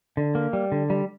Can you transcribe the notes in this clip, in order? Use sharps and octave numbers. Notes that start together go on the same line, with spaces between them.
D3
A#3
G3
D3
G3